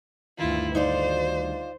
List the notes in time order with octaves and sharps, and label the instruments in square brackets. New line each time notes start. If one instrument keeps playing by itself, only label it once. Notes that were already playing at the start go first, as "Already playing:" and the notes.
[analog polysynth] D2 G2 D#3 [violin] E4 F4
[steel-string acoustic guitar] D#4 F4 D5 [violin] C5